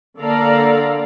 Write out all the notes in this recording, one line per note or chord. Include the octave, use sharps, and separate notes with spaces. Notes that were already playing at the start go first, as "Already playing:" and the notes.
D3 A#3 A4 D5 F5 A#5